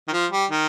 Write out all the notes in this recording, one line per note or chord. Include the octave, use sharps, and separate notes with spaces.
D#3
F3
G3
D#3